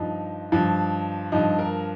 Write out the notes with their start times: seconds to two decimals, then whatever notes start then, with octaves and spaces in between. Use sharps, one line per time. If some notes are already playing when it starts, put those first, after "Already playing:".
Already playing: G2 F3 D#4
0.52 G2 F3
1.32 G2 F3 D#4
1.59 A#4